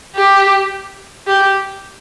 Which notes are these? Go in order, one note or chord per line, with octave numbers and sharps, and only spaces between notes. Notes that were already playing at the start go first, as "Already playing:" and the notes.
G4
G4